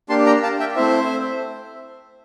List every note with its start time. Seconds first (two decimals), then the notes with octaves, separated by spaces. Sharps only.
0.09 A#3 D4 G4 A5 C6
0.26 G5 A#5
0.43 F5 A5
0.60 E5 G5
0.76 A3 C4 E4 C5 E5